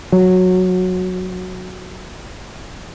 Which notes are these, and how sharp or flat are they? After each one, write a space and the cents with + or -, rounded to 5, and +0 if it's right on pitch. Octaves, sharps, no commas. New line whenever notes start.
F#3 -10